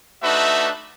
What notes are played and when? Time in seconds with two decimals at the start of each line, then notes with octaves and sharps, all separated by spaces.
0.23 A3 D4 D#4 F#4 B4 E5